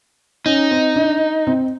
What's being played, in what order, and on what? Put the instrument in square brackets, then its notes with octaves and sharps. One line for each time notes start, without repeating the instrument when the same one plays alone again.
[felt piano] C#4 [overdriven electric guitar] D#4
[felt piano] C4
D4
C4